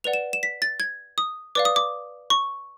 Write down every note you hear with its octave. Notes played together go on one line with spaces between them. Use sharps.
B4 D5 F#5 F7
E7
E7
B6
A6
G#6
D#6
B4 D5 F5 D6
D#6
D6
C#6